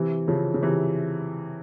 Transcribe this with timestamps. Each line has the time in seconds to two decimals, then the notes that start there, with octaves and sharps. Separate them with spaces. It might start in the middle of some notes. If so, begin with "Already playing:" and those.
Already playing: C3 E3
0.28 C#3 F3
0.54 C#3
0.62 C3 E3